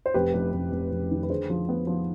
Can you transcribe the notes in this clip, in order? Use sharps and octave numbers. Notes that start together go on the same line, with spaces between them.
C5
F1 G4 B4
F1
F1
F1
F1
D#3
B4
D3 G#4 C5
F3
B3
F3